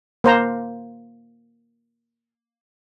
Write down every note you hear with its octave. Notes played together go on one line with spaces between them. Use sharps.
A#3 C5 A#5